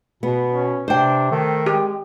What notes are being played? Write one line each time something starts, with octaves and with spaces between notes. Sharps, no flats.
B2 B3
C#4
C3 D4 C5 G5
D#3 A3
G#3 G4